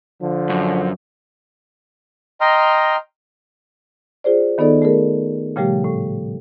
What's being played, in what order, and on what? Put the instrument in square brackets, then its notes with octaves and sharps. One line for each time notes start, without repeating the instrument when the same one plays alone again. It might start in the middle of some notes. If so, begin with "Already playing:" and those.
[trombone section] D3 F3
[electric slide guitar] F#2
[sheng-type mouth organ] D#5 G5 A#5 C6 F6
[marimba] F4 G#4 C5 D5
D#3 B3 D#4 A4 D5
A3 G#4 A#4
A#2 C#3 F3 G3 A3 G4
A2